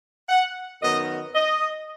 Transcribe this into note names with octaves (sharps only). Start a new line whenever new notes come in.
F#5
F#2 D#3 B3 D#5
D#5